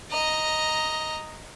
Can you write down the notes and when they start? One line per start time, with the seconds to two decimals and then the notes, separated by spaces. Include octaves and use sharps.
0.12 D#5 A#5